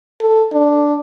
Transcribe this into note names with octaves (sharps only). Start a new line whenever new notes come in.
A4
D4